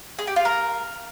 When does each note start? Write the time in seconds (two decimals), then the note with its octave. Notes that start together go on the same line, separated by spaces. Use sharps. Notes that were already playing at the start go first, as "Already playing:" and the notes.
0.19 G#4
0.27 G4
0.36 F4
0.45 A#4